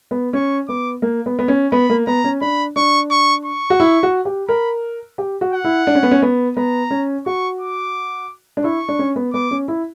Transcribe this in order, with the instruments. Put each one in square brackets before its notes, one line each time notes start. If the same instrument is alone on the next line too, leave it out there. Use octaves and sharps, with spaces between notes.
[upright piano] B3
[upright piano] C#4 [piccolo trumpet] C#6
[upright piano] B3 [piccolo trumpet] D6
[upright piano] A#3
B3
B3
C#4
[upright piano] B3 [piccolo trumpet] B5
[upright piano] A#3
[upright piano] B3 [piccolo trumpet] A#5
[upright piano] C#4
[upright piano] D4 [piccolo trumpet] B5
[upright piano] D4 [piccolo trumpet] C#6
[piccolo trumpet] C#6
C#6
[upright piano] F#4
E4
F#4
G4
[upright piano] A#4 [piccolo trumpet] B5
[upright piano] G4
F#4
[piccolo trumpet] F#5
[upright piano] E4
D4
C#4
B3
C#4
B3
[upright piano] B3 [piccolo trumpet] A#5
[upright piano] C#4
[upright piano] F#4 [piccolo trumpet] C#6
[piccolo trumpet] D6
[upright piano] D4
[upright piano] E4 [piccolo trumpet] C#6
[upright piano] D4
C#4
B3
[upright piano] B3 [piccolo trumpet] D6
[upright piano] C#4
E4